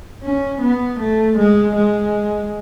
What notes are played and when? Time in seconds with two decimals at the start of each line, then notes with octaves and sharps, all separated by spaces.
0.24 C#4
0.61 B3
1.00 A3
1.38 G#3
1.75 G#3